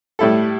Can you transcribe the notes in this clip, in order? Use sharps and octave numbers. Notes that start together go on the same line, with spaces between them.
A2 G3 E4 A4